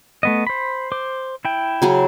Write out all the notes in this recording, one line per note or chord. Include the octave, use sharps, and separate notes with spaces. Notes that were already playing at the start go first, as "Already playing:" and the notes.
A3 B3 D#5
C5 B5
C5 D6
E4 G5
C#3 F#3 C#4